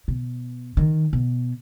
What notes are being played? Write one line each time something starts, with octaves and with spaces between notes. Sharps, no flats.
B2
D#3
B2